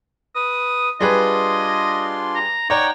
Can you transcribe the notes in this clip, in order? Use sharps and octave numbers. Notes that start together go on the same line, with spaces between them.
B4 D#6
G3 D4 F4 G#4 B4 D#5 C6
A#5
D#4 C#5 D5 F#5 G5 A#5